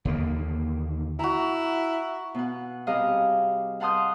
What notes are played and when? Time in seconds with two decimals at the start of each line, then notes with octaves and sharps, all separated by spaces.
0.05 D#2 D3 A#3
1.19 E4 F#4 A#5
2.35 B2 F#5
2.87 C3 G3 G#4 D#5 F5
3.80 F5 F#5 A5 C6 D#6 G6